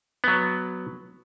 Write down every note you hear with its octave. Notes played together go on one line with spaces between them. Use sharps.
F#3 B3